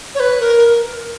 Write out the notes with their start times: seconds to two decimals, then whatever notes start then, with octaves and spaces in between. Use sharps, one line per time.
0.15 C#5
0.20 B4
0.41 A#4